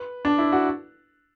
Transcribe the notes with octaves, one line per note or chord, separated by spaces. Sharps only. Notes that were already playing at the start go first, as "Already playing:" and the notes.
Already playing: B4
D4
E4
F#4